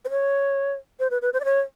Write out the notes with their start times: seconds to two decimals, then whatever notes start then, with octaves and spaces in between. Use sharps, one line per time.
0.05 C5
0.10 C#5
1.00 C5
1.11 B4
1.22 B4
1.34 C5
1.40 D5
1.45 C#5